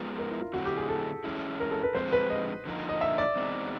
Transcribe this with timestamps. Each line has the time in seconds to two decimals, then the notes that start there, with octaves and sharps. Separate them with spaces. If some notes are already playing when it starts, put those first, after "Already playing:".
Already playing: G#2 F3 G#3 B3
0.18 A#4
0.30 E4
0.41 F4
0.53 D3 F#3 A3 C4 E4 F#4
0.65 G4
0.77 G#4
0.88 A4
1.24 G#2 E3 G#3 C#4 E4
1.60 A#4
1.71 A4
1.83 B4
1.95 D3 F3 G#3 C4 C5
2.13 B4
2.30 D#5
2.65 D3 F3 A#3 D#4
2.89 D#5
3.01 E5
3.18 D5
3.36 E2 B2 G#3 C4 D#4